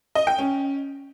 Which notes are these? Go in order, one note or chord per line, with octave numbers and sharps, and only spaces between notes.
D#5
G5
C#4